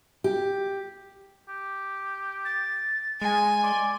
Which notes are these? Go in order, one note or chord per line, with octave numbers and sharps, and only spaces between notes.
G4
G4
A6
G#3 G#5
D5 C6